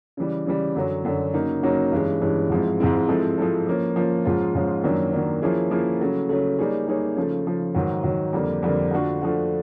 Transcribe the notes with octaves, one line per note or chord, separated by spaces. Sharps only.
C#3 E3 G3
C#3 E3 G3
F#2 D3 F#3
F#2 D3 F#3
C#3 F#3 A#3 D#4
C#3 F#3 A#3 D#4
G2 E3 G#3 C#4
G2 E3 G#3 C#4
G#2 F3 G#3 C4 E4
G#2 F3 G#3 C4 E4
F3 G#3 C4 E4 A4
F3 G#3 C4 E4 A4
F3 A#3 C#4
F3 A#3 C#4
G#2 F3 G#3 C#4 F4
G#2 F3 G#3 C#4 F4
F#2 D#3 F#3 A#3 D4
F#2 D#3 F#3 A#3 D4
F3 A#3 C#4 E4 G#4
F3 A#3 C#4 E4 G#4
C#3 F#3 A3
C#3 F#3 A3
G3 A#3 D#4 G#4 C#5
G3 A#3 D#4 G#4 C#5
C#3 F3 A3
C#3 F3 A3
G#2 D#3 F#3
G#2 D#3 F#3
F2 D3 G3 A#3
F2 D3 G3 A#3
D3 F3 A3 D4 F#4
D3 F3 A3 D4 F#4